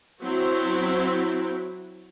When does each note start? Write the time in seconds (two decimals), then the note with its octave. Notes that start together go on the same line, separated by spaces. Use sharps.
0.22 F#3 C4 E4 F#4